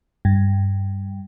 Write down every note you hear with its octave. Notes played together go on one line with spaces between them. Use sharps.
G2